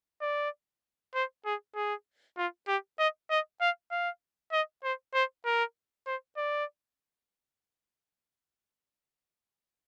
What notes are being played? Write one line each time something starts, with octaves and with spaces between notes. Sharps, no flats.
D5
C5
G#4
G#4
F4
G4
D#5
D#5
F5
F5
D#5
C5
C5
A#4
C5
D5